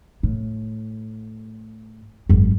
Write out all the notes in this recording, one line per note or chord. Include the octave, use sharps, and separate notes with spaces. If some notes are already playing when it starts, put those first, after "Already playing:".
A2
G#1 F#2